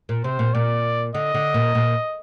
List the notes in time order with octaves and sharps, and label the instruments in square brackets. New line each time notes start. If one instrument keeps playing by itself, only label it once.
[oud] A#2
[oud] C3 [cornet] C5
[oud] A#2
[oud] A#2 [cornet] D5
[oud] D3 [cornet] D#5
[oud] D3
A#2
A#2